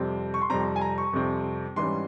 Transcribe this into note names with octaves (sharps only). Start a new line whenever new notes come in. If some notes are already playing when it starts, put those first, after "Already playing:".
Already playing: F2 C3 G3 C4
C#6
C6
F2 C3 G3 C4 A#5
G#5
A#5
C#6
F2 C3 G3 C4
G#2 E3 G3 C#4 C6